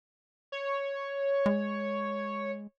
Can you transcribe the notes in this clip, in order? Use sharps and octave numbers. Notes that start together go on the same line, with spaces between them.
C#5
G#3